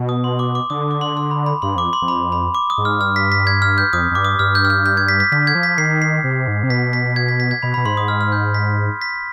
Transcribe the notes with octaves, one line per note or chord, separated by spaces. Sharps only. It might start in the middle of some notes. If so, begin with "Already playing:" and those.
Already playing: B2
D#6
C6
D6
D6
D3 D#6
D6
C6
C6
B5
B5
G2 C6
F2 D6
C6
F2
B5
B5
D6
D#6
G#2
F6
G2 F6
B6
B6
G#6
F6
G6
F2 D#6
F2
G2 D6
D#6
G2 F6
G6
F6
G6
G6
G#6
B6
B6
D3 B6
G#6
F3
B6
D#3 C7
C7
C3
G#2
C3
B2 B6
B6
G#6
B6
B6
G#6
B2 B5
B5
B2
G#2 C6
D#6
F6
F6
G6
B6
B6